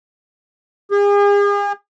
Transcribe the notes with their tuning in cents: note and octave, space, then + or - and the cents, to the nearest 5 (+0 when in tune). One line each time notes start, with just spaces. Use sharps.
G#4 -40